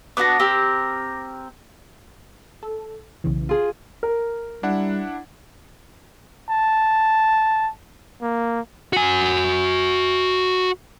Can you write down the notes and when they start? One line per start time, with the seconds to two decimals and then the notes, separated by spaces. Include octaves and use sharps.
0.17 B3 D4 F#4 D6 A#6
0.40 C4 G4 A#4
2.63 A4
3.24 B1 C#3 E3
3.49 F4 G#4
4.03 A#4
4.63 G3 D4 E4 F#5
6.50 A5
8.22 A#3
8.93 F#4 G#5